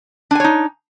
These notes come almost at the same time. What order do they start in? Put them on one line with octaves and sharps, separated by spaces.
D4 G#5 C#5 D#4